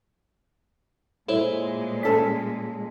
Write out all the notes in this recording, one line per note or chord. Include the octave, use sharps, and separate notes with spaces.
A#2 G#3 E4 A4 C5 C#5
C#4 A4 B6